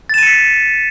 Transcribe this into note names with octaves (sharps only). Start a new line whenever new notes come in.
A6 B6 C#7 D#7 E7